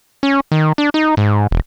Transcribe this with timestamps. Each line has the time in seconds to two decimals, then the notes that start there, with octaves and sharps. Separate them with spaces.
0.23 C#4
0.52 D#3
0.78 D4
0.94 D#4
1.17 G#2
1.51 E1